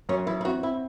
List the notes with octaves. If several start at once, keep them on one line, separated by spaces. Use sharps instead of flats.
F#2 C#4
E3 E4
E4
C4 F#4
C4 E4